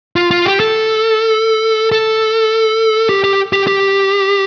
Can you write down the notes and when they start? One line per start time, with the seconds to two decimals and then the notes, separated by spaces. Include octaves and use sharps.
0.16 F4
0.31 F4
0.45 G4
0.60 A4
1.92 A4
3.09 G4
3.24 G4
3.53 G4
3.67 G4